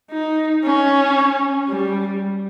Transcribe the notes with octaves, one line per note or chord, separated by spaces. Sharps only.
D#4
C#4
G3